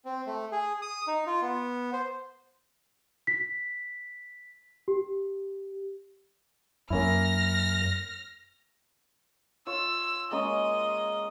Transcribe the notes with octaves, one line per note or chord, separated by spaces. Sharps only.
C4
A3
G#4
D#6
D#4
F4
B3
C5
B6
G4
F#2 A#3 C#4 E4 F6 A#6
F4 C#5 E6
G#3 A#3 C#4 D#5